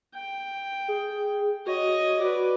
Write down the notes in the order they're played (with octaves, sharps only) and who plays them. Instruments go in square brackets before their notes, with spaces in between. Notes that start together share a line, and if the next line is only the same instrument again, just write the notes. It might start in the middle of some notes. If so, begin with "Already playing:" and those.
[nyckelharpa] G5
[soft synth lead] G#4
[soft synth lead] F#4 [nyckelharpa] C#5 D#5
[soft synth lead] F#4 [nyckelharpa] B4 D5